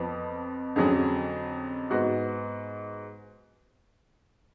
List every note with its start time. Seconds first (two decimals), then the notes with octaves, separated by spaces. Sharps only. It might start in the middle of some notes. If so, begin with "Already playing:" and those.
Already playing: F2 F3 B3
0.76 F2 D3 F#3 C#4 G#4
1.90 G#2 G#3 B3 F#4